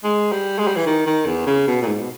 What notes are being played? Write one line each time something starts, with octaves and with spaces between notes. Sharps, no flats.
G#3
G3
G#3
G3
E3
D#3
D#3
E2
C#3
B2
A#2
G#2
B2